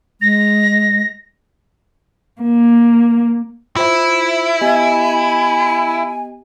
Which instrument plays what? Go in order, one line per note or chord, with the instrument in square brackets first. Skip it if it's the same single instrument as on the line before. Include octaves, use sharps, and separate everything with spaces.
[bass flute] G#3 [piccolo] A#6
[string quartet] A#3
[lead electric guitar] E4 [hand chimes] F4 C5 E5
[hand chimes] B3 G4 D#5 [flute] G#5